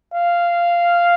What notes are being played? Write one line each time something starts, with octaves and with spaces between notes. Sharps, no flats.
F5